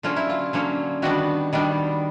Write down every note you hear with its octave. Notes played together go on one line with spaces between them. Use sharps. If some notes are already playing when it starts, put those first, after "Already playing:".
D3 F#3 A#3 C#4 F4
E4
F4
D3 F#3 A#3 C#4
D#3 G3 B3 D4 F#4
D#3 G3 B3 D4